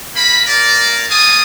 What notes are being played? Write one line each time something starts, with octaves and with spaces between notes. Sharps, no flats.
A#3 B5
A#3 A#4 D5
A#3 C4 G#5 A5 D#6